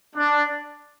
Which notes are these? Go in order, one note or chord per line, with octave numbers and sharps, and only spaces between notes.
D4